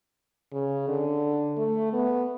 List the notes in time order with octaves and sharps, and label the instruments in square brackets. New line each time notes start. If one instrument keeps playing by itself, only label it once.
[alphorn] C#3
D3
A3
B3